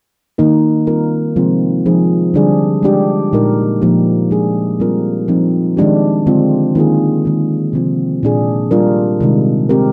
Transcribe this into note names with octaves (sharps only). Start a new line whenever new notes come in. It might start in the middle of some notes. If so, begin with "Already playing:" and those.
D#3 A#3 D#4 A#4
G3 C4 F4 A#4
C3 F3 G#3 C4 F4
F3 G#3 D#4 G#4
D3 G3 D4 G#4
G#3 D4 G4
A#2 G#3 D#4 A#4
A#2 F3 A#3 D#4 G4
F3 G#3 D4 G#4
G3 C4 F4 A#4
F3 C4 D#4
D#3 G#3 D4 G4
D3 G#3 C4 F4
D#3 A#3 F4 G#4
D#3 G#3 C4
C3 F3 C4 F4
A#2 G#3 D4 G#4
G3 D4 F4 A#4
C3 D#3 G#3
G#3 C4 G4 A#4